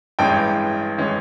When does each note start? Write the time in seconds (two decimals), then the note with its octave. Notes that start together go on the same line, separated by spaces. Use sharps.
0.19 A1 G2 E3 G#3 C#4 G5
0.98 E3 G#3 C#4